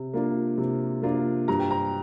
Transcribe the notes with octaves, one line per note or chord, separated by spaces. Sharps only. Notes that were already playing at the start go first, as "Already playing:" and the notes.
Already playing: C3
A#3 D4 F4
C3
A#3 D4 F4
G2 A#5
G5
A#5